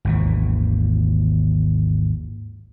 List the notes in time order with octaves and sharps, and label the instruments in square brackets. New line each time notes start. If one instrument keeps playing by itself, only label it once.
[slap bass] G#1 D#2 E3